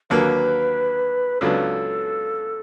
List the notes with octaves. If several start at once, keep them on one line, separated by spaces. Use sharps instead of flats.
D#2 D3 F#3 A#3 B4
C#2 C#3 F#3 B3 D4 A4